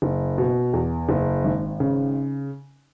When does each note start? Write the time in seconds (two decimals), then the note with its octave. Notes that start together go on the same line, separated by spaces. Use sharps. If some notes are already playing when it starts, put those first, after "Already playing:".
0.02 F#1
0.38 B2
0.73 E2
1.09 F#1
1.44 G#1
1.80 C#3